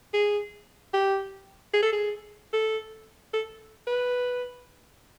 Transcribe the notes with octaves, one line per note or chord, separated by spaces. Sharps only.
G#4
G4
G#4
A4
G#4
A4
A4
B4